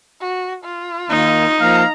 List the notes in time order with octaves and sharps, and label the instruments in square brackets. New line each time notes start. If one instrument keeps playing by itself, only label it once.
[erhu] F#4
F4
[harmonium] D#3 A#3 [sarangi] D#4
[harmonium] F3 A#3 [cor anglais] F5 [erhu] A#5